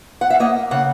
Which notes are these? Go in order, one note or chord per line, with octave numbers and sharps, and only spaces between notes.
F#5
E5
A#3 D#5
C#3 F#5